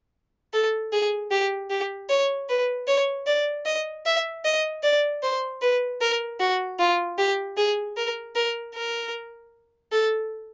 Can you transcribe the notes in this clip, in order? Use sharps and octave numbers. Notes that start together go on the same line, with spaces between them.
A4
G#4
G4
G4
C#5
B4
C#5
D5
D#5
E5
D#5
D5
C5
B4
A#4
F#4
F4
G4
G#4
A#4
A#4
A#4
A4